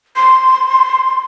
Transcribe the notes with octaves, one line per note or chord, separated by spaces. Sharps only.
C6